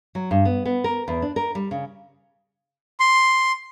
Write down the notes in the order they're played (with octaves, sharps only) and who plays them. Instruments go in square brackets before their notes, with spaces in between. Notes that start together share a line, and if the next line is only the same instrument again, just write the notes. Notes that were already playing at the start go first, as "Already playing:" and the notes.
[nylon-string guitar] F#3
G2
B3
B3
A#4
E2
D4
A#4
G3
C#3
[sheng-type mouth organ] C6